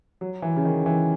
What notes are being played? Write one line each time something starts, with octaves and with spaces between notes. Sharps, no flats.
F#3
E3
C#3
D#3
E3